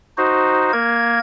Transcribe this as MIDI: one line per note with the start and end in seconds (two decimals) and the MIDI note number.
0.18 0.72 63
0.18 0.72 66
0.18 0.72 72
0.73 1.19 58
0.73 1.19 70
0.73 1.19 92